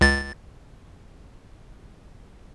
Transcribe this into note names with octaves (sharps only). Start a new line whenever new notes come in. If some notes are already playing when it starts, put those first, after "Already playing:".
C#2 A6